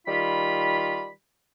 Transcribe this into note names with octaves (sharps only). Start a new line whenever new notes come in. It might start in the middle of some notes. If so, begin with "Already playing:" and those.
D#3 G3 F4 B5